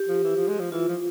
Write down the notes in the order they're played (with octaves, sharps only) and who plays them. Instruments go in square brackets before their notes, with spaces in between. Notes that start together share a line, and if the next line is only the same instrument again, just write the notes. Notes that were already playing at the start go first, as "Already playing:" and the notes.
Already playing: [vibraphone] G4
[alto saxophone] F3
E3
F3
G#3
F3
[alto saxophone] E3 [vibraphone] F4
[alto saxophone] F3